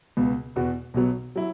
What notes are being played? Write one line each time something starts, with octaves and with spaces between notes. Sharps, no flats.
C#2 B2 B3
E2 B2 B3 F#4
B1 B2 F#3 B3
F#3 E4